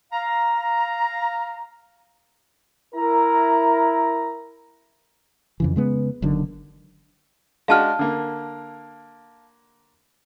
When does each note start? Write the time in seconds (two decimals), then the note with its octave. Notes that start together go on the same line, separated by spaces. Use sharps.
0.13 F5 A#5
2.95 E4 A#4 A#5
5.60 F2 C#3 E3
5.76 C#3 G#3 B3
6.22 F#1 F#2 D3 D#3
7.68 G#3 D4 F#4 F5 A5 F6
7.99 D3 A#3